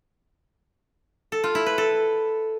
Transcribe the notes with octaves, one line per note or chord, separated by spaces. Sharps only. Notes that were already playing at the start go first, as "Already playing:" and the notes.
A4
F4
E4
B4
A4